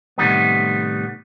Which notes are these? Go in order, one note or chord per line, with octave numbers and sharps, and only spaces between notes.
A2 C3 D#3 G3 B3